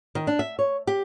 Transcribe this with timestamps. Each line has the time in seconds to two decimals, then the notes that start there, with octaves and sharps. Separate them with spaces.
0.15 D#3
0.27 D4
0.39 E5
0.59 C#5
0.87 G4